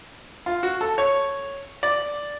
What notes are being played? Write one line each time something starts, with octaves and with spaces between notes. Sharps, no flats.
F4
F#4
A4
C#5
D5